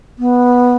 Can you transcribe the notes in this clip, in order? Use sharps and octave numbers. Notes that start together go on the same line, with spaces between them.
B3